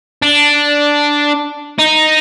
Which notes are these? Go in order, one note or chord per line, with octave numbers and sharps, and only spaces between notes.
D4
D#4